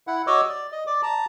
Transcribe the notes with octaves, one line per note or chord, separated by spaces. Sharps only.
E4 F#5
F#4 C#5 D#5 D6 E6
D5
D#5
D5 D6
A5 A#5